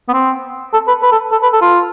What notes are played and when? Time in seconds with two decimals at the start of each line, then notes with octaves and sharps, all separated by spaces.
0.08 B3
0.13 C4
0.73 A4
0.87 B4
1.03 B4
1.12 A4
1.32 A4
1.43 B4
1.53 A4
1.62 F4